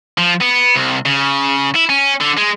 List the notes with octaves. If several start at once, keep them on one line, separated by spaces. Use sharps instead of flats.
F3
B3
C2
C#3
E4
C#4
D3
G#3